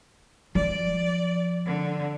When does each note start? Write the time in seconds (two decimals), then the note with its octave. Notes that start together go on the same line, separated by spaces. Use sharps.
0.55 F3 D5
1.66 D3